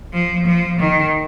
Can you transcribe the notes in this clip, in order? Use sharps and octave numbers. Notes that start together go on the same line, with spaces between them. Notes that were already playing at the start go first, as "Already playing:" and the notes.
F3
F3
D#3